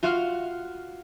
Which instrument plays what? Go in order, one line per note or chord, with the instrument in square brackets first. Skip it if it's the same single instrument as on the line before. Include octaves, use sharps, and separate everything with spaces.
[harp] F4 F#4 F5 F#5 F6